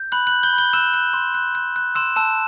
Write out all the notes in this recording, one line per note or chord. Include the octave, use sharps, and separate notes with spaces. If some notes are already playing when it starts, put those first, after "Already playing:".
Already playing: G6
B5 F#6 F#7
F#6 F#7
G6
G6 G7
B5
G6 G7
E6 F#6 E7
F#6
C6
F#6
F#6
F#6
C6 E6 E7
A5 E6 E7